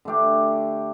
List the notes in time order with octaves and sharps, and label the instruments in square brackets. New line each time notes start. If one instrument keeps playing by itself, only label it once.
[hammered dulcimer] D3 A3 D4 G4